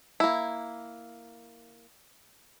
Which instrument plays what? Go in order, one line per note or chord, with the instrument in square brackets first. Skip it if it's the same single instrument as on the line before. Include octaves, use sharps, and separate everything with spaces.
[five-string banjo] A#3 E4